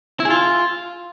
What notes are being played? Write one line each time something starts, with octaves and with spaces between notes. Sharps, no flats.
E4
G#4
F4